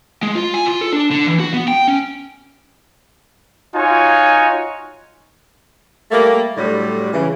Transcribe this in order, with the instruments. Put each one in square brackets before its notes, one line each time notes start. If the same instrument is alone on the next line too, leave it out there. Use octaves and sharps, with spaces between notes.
[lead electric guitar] G#3
F4
G#5
F4
A4
D4
D3
E3
F#4
B3
G5
C#4
[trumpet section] D#4 F4 F#4 C#5 G#5
[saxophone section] G3 A3 A#3
A2 D3 F#3 G3
C#3 E3